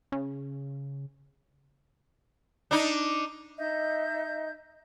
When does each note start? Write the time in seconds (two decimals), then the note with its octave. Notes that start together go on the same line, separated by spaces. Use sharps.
0.12 C#3
2.71 D4 D#4
3.58 D#4 D#5 E5 G6